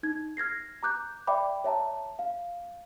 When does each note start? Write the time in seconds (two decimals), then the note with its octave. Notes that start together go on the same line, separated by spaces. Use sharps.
0.03 D#4 G#6
0.37 F6 G#6 A#6 C7
0.83 A#5 D6 F#6 G6
1.27 D5 E5 G5 B5 D6
1.64 C#5 E5 A5 A#5
2.19 F5